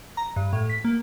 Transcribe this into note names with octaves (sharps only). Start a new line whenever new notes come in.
A#5
G2
A2
B6
A#3